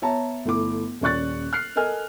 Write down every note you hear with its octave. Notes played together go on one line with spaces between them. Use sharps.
B3 C#5 E5 A5 A#5
G1 A3 E4 D6
D#1 C#4 D5 C#6 F#6 A6
F6 F#6 C7
A4 A#4 D#5 G#5 F6